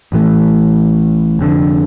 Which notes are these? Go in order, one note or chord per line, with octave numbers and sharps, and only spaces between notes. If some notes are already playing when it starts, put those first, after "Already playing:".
A1 A2 E3 A3
F1 F2 D3